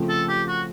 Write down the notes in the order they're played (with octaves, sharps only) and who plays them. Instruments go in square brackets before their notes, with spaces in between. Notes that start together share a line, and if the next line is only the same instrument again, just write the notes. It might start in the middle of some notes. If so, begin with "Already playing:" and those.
Already playing: [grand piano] C#3 F3 A3 C4 F4
[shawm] A4
G4
F#4